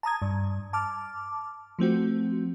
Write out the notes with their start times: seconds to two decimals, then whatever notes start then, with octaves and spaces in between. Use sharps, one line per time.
0.03 A5 A#5 D#6 G#6
0.22 G2
0.73 A5 D6 F6
1.79 F3 A3 C4 F#4